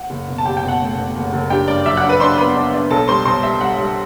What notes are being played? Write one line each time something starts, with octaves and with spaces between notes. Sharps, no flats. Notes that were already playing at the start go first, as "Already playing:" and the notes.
Already playing: F#5
F#1
B2
A5
F#1 G4 G5
G5
B2
F#5
A3
B2
F#1
F#1
D4 G4 G5
G2 D5 D6
F#3 E5 E6
F#5 F#6
D4
B4 B5
D4 C5 C6
B3 B4 B5
D4
D4
B1 A4 A5
G3 C5 C6
B1 C5 C6
G3 E5
G3 F#5
G3